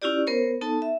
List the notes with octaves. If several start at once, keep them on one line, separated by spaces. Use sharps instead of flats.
C#4 E4 F4 G4 D5
B3 A#4 C5 C#5
B3 D#4 A4 A5
E5